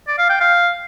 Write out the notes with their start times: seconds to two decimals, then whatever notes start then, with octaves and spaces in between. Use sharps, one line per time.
0.08 D5
0.19 F5
0.29 G5
0.40 F5